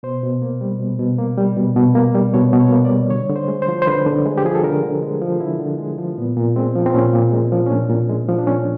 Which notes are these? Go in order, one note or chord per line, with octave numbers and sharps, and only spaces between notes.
B2 C5
B2
A#3
G3
B2
B2
A#3
G3
B2
B2
A#3
G3
B2 C#5
B2
C#5
A#3
D5
G3
D3 C#5
D3
C5
G#3
C5
F3
C5
D3 B4
D3
G#3
G4
F3 G#4
A4
D3 A#4
D3
G#3
F3
D3 E4
D3
G#3
F3
A#2 B3
A#2
G#3 C4
F3
C4
A#2 C#4
A#2
G#3
F3
C#4
A#2 D4
A#2
G#3
F3
D4
A#2 C#4